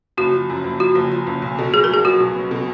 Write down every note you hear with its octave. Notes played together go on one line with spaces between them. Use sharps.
F#1 F#4
F3
F#2
F#1
F3 F#4
F#1
F3
F#1
B1
B2
F#3 G#4
A#4
F#3
G#4
F#3 F#4
B1
B3
B2